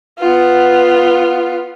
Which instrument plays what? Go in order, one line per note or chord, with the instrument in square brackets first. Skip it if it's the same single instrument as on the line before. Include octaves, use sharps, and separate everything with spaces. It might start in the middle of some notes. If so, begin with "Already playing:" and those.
[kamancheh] B3 F4